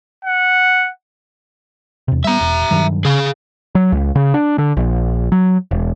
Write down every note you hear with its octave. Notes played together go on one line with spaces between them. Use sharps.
F#5
E2 C3
G3 B3 E5 A#5
E1
G2 D#3 F#3
C#3 G#4 F5
F#3
C#2
C#3
D4
D3
A#1
F#3
E1